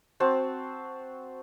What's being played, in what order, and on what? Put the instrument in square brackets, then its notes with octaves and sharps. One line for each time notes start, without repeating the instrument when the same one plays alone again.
[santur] C4 F#4 C5 A5